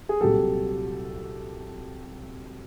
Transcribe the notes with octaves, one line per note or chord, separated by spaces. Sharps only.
G#4
C2 A#2 F#3 G4 A4